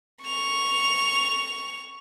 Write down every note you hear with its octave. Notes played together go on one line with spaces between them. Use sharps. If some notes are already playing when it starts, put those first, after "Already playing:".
C#6 F7